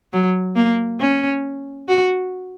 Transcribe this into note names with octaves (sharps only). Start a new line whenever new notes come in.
F#3
A#3
C#4
F#4